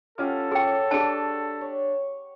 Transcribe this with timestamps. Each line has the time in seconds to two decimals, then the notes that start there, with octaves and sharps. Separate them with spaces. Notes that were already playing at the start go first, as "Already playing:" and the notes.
0.18 C#4 F4 G4 A4 F#5 D6 F6
0.52 G#4 C#5 G5 C#6
0.91 D4 G4 G#4 A5
1.61 C#5